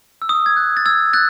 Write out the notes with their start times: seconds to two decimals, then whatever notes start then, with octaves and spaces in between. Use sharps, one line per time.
0.22 E6
0.29 D#6
0.46 G#6
0.56 F#6
0.77 A6
0.86 E6 G#6
1.13 F#6 A6